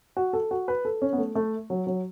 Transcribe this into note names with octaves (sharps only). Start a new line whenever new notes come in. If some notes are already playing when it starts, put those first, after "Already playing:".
F#4
A4
F#4
B4
A4
C#4
B3
A3
A3
F#3
F#3